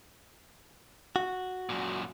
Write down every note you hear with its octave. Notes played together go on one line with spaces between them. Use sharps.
F#4
F#2 A#2